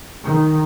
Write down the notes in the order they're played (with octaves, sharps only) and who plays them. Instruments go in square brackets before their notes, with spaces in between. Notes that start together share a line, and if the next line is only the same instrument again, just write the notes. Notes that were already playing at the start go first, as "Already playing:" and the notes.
[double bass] D#3